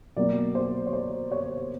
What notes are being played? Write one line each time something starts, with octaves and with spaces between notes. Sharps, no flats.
B2 F#3 A#3 D5
C5
C#5
C5
C#5
C#5